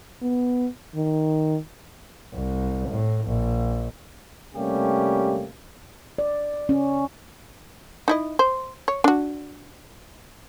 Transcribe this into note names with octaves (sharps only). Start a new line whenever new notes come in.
B3
D#3
C2
A2
A#1
C3 G3 A3 A#3 C#4 G4
D5
C#4
D#4 E4 D#5
C5
C#5
D4 F#4